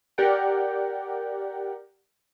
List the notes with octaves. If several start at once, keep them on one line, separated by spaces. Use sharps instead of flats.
G4 A#4 D5 F#5 G5